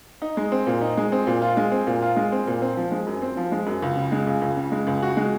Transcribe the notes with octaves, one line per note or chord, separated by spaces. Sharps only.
D#4
G#3
C4
A#2
D#4
G#3
C4
A#2
F4
G#3
C4
A#2
F4
G#3
C4
A#2
C4
F3
G#3
F#2
C4
F3
G#3
F#2
C#2
C#3
G#3
C#2
C#2
C#3
G#3
C#2
F#4
G#3